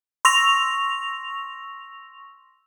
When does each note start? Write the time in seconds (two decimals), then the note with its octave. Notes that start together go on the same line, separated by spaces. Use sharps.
0.25 C6 C#6 E6 A#6 F7